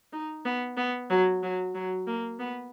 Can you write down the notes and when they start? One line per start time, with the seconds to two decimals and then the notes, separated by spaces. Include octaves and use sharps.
0.13 D#4
0.45 B3
0.77 B3
1.10 F#3
1.43 F#3
1.75 F#3
2.07 A#3
2.39 B3